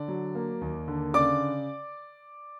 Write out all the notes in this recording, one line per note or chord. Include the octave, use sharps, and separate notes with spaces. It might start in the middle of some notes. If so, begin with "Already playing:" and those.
Already playing: D3 D5
F#3
A#3
D#2
D3
C#3 D5 D6